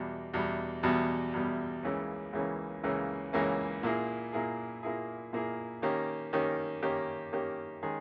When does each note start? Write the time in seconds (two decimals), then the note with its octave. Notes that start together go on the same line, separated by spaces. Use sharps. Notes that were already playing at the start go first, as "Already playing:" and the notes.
Already playing: E2 B2 G3
0.34 E2 B2 G3
0.83 E2 B2 G3
1.33 E2 B2 G3
1.83 C#2 C#3 E3 A#3 C#4
2.33 C#2 C#3 E3 A#3 C#4
2.83 C#2 C#3 E3 A#3 C#4
3.33 C#2 C#3 E3 A#3 C#4
3.83 A#2 A#3 E4 G#4
4.33 A#2 A#3 E4 G#4
4.83 A#2 A#3 E4 G#4
5.33 A#2 A#3 E4 G#4
5.82 D#3 A#3 C#4 G4
6.33 D#3 A#3 C#4 G4
6.83 D#3 A#3 C#4 G4
7.32 D#3 A#3 C#4 G4
7.83 D#3 G#3 C#4 G#4